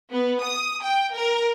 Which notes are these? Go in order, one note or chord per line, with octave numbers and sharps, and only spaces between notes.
B3
D#6
G5
A#4